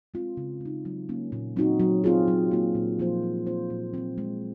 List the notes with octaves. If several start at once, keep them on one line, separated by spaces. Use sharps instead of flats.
G#3 C4 F4
C#3
G#3 D#4
F#3
A#3 C#4
A#2
F#3 C4 D#4 F#4
F#3
C4 F4 G#4
F#3
A#3 F4
A#2
F3 A#3 F4 C5
G#3
C4 F4 C5
A#2
F#3 C4
G#3